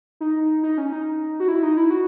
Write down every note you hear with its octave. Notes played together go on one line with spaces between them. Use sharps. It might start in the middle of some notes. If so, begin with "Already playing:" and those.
D#4
D#4
C#4
D#4
F#4
E4
D#4
E4
F#4